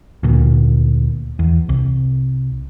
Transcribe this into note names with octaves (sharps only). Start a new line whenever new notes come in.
D2 A#2
E2
C2